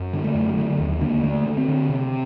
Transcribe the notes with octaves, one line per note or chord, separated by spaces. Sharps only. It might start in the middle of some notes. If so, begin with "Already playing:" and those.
Already playing: F#2
D3
A3
F#2
D3 A3
D#2
D3 A#3
D3 A3
D3
C4
D3
C3